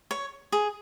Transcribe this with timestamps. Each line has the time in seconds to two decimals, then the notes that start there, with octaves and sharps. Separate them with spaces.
0.11 C#5
0.52 G#4